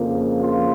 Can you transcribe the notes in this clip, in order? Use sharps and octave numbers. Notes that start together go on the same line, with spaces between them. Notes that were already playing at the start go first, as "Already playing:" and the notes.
Already playing: F2 C#3 F3 A#3
F4